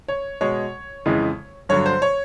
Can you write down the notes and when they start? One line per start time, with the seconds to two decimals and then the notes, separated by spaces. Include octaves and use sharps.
0.08 C#5
0.41 B2 G#3 C#5
1.06 F2 C#3 E3 G#3
1.69 G2 D3 F#3 C#5
1.86 C5
2.02 C#5